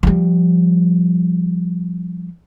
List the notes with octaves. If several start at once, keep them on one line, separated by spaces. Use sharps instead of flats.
F3 G3